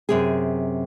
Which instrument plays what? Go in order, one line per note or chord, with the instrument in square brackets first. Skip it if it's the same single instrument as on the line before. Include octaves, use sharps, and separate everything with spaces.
[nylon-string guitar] F#2 C3 G#4